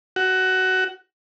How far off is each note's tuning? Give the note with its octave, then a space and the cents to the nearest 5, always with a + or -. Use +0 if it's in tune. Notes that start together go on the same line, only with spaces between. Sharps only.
F#4 +15